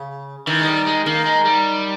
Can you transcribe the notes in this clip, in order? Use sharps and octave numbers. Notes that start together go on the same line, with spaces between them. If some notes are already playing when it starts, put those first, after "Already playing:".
Already playing: C#3
D#3 E3
G#3
G3
G#3
D#3 A#3
G#3
G3